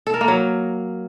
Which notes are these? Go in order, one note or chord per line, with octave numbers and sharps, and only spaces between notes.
A4
A#4
A#3
F#3